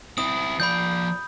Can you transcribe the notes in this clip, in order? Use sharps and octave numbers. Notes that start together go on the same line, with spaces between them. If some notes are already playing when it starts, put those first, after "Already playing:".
C4 E4 D#6
F3 D5 B5 G6